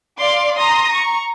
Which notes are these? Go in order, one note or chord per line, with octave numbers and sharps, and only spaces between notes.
D5 F5 C6 D6
A#5 C6 D#6 A#6
A#5 C#6